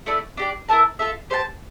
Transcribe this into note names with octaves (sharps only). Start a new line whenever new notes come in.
A3 E4 A4 D5
D4 G4 D5
E4 A#4 E5 A5
F4 A4 E5
G4 C5 F5 A5